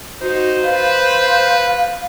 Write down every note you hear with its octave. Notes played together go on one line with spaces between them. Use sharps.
D#4 F#4 C5
B4 F5